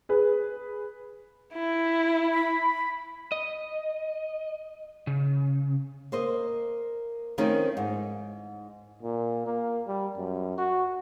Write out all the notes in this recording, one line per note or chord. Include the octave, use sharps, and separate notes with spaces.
G#4 B4
E4
B5
D#5
C#3
A#3 C5 D#5
D#3 F3 A3 C4 C#4 D#4
G#2
A#2
A#3
G3
F#2
F#4